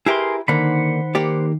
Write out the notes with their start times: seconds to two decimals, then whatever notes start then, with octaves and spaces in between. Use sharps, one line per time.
0.06 E4 G4 G#4 A#4 B4 C6
0.48 D3 D#3 A#3 C5 F#5 B5
1.15 A#3 G4 D5